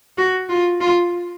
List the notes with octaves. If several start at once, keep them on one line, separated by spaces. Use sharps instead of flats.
F#4
F4
F4